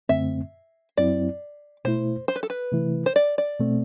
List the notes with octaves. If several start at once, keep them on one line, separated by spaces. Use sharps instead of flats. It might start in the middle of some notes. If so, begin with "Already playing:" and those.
F#2 D3 A3 C4 E5
F#2 F#3 C4 E4 D5
B2 A3 E4 C5
C5
B4
A4
B4
C3 E3 A3 E4
C5
D5
D5
B2 A3 C4